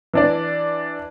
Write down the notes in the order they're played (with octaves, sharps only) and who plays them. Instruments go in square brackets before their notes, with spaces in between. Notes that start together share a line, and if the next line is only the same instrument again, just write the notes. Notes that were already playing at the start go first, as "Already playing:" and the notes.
[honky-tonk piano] E3 D4 D5